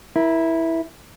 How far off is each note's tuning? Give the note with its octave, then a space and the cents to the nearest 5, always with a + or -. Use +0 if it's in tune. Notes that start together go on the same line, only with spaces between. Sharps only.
E4 -5 A#4 +25